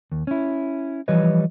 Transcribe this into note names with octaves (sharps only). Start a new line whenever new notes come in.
D#2
C#4 E4
E3 F3 G3 B4 C#5 D#5